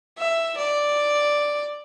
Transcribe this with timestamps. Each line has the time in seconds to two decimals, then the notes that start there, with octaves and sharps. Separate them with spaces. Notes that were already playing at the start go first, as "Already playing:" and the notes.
0.18 E5
0.58 D5